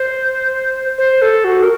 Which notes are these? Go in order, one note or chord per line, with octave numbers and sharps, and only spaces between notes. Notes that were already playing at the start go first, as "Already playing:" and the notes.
Already playing: C5
C5
A4
F#4
A#4